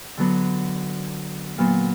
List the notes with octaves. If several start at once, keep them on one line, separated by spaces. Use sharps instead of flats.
D3 F#3 B3 D4
A#2 F#3 B3